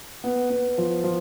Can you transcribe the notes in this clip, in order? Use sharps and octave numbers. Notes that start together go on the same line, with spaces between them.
B3
B3
F3
F3